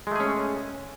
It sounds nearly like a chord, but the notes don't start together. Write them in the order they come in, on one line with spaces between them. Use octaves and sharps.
G#3 A3 G#4 C#4